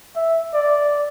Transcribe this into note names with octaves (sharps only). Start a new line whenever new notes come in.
E5
D5